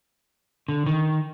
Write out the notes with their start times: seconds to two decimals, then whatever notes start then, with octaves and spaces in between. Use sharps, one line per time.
0.68 D3
0.86 D#3